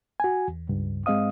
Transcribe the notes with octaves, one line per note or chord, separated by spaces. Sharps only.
F#4 G#5
E2
C#2 G2
G#2 G#3 C4 D#5 F5 D#6